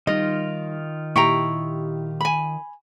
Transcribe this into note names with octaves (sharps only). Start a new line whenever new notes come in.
D#3 G3 D#4 F4 D#5
A#2 E4 G4 G5 A#5 C#6
G#5 B5